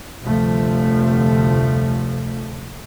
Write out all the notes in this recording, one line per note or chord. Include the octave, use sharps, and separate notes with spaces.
F1 D2 G2 C3 F3 A3